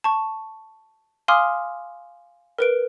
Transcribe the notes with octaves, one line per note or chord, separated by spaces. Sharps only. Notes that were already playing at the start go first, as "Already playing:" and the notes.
A5 C#6
F5 G#5 C6 D6 D#6 F6
A#4 B4 D7